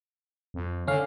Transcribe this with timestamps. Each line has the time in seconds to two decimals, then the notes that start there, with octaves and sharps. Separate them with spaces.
0.54 F2
0.87 D3 C#4 F5